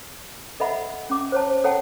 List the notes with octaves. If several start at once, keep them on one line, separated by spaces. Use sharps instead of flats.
A4 D#5 E5 F#5 B5
C#4 D6
C5 C#5 A5
A4 C#5 F#5 G5 A5